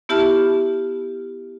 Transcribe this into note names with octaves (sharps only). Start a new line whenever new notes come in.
B3 E4 G4 E5 A5 F6